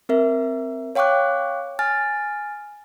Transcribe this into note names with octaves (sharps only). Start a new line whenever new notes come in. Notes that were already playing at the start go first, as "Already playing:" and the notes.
C4 A#4 E5
C#5 F5 G5 C#6 D6 F#6
G#5 F6 A6